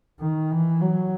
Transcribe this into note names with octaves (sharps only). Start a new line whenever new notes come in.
D#3
E3
F#3